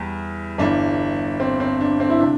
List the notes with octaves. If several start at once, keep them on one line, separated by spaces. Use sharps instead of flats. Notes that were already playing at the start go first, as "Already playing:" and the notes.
Already playing: E2 G3
G1 G2 E3 D4
C4
C4
D4
C4
E4
C3 D4